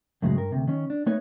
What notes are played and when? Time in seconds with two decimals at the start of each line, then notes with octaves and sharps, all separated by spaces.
0.22 F#2 A2 C#3 F#3 G#3
0.36 G2 A#4
0.52 D2 G2 C3
0.67 D#3 C#4
0.90 D4
1.06 A3 B3 D#4 B4 C#5